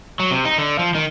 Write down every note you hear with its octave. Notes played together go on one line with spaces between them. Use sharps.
F#3
C3
D#4
D3
F3
D#3